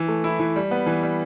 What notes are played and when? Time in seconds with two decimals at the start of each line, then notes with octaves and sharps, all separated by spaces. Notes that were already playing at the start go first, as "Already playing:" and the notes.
Already playing: E3
0.08 A3
0.24 E4
0.40 E3
0.56 G3
0.71 B3
0.86 E3
1.03 G3